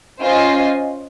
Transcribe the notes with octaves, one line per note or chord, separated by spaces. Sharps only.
C#4 F4 C5 D#5 G#5